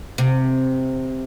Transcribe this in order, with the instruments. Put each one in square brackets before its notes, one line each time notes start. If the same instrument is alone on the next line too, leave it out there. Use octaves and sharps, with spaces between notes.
[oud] C3